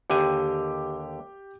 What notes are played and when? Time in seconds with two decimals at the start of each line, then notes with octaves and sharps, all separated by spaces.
0.10 D#2 D3 G4 G5 G#5